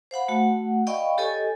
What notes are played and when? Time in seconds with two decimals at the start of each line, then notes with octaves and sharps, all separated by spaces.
0.11 C5 F5 F#5 B5
0.28 A3 F#4 F#5
0.87 D5 D#5 F5 G5 B5 C#6
1.18 G4 A4 C#5 D#5 G#5